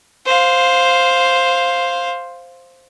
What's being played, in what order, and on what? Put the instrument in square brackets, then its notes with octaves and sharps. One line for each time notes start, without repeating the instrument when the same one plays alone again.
[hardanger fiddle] C5 F5